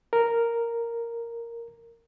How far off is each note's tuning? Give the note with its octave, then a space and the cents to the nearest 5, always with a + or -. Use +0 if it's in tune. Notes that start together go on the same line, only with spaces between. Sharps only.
A#4 -5